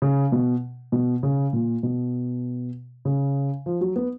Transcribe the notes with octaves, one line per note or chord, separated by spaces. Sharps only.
C#3
B2
B2
C#3
A#2
B2
C#3
F3
F#3
B3